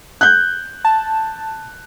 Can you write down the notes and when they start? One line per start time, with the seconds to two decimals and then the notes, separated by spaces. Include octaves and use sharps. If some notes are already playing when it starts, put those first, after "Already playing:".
0.21 F#6 G6
0.85 A5